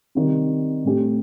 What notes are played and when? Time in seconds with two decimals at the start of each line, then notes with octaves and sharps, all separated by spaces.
0.15 C3 D#3 G3
0.84 A2 A3 C4 G4